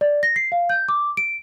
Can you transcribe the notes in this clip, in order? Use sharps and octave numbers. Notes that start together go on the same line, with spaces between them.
D5
A#6
C7
F5
G6
D6
D7